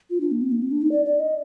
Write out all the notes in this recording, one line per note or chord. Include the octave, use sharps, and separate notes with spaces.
F4
D4
A#3
C4
A#3
C4
D4
D#4
D5
D5
D#5